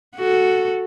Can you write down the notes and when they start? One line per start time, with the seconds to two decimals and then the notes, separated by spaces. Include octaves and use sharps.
0.16 F#4 A4